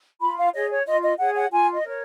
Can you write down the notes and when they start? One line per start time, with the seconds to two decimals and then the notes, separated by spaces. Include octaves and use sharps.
0.21 F4 B5
0.38 F5
0.54 G#4 C#5 D#5
0.70 C#5
0.87 F4 D#5
1.03 D#5
1.19 G#4 C#5 F#5
1.36 F#5
1.52 F4 G#5
1.74 D#5
1.85 A#4 C#5